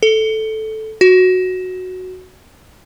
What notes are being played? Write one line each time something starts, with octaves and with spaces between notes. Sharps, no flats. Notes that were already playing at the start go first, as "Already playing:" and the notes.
A4
F#4